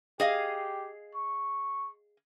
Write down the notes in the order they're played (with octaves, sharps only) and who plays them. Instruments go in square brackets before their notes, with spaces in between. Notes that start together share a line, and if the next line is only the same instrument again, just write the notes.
[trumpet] G4 [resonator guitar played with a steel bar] G#4 D#5 F5
[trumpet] C#6